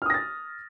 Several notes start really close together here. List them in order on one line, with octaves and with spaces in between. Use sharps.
F6 D#6 A#6 A6